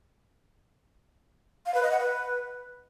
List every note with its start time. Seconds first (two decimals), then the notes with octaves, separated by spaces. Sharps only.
1.66 F5
1.74 B4
1.83 D#5
1.91 F#5
2.00 B4